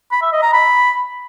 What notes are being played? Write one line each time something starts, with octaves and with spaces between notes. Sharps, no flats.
B5
E5
D#5
A#5
B5